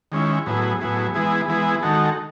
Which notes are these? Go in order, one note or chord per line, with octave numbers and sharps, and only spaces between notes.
D#3 G#3 C#4 E4
A2 F#3 B3 E4 G#4
A2 F#3 B3 E4 G#4
E3 G#3 B3 E4 G#4
E3 G#3 B3 E4 G#4
D#3 G#3 D#4 F#4 A4